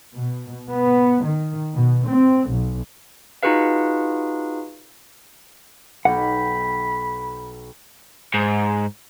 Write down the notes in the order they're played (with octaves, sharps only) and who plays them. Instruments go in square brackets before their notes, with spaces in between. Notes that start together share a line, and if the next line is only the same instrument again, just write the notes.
[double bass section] B2
B3
D#3
B2
C4
B1
[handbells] D#4 F4 F#4 G#4 B4 F5
[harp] B1 G5 [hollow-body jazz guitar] F#5 [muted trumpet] B5
[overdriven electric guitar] G#2